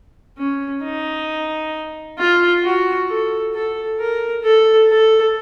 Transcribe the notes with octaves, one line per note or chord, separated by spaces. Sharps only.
C#4
D#4
F4
F#4
A4
A4
A#4
A4
A4